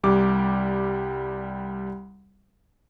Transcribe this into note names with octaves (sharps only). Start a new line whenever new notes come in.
C2 G3 D6